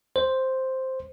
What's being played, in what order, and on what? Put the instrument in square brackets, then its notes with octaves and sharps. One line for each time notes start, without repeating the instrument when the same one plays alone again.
[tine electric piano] C5